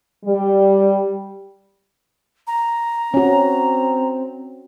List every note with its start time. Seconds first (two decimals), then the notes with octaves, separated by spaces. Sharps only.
0.25 G3
2.47 A#5
3.14 C4 C#4 F#4